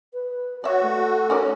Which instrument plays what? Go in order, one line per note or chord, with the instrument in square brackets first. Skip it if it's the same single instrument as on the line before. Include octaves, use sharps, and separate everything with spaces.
[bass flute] B4
[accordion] F#4 [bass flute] C#5 [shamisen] D5 E5
[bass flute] A3
[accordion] C#4 [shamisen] D#4 A#4 D5